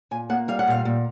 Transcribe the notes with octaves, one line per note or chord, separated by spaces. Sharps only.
A#2 G#5
A#3 F#5
G3 F5
F#5
A#2 F5
A#2